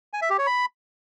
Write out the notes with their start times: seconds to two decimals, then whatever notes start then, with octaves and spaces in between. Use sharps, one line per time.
0.13 G#5
0.22 E5
0.30 G4
0.38 C#5
0.47 B5